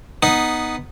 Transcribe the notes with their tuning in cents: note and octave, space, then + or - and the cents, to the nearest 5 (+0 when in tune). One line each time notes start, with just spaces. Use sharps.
B3 +0 D#4 +0